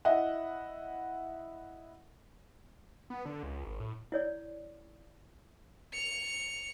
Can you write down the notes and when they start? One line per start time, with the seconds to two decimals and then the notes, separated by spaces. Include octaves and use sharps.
0.05 E4 D#5 E5 F#5
3.10 B3
3.25 D3
3.43 C#2
3.64 G#1
3.80 A2
4.12 E4 C#5 D5
5.93 C#7 F7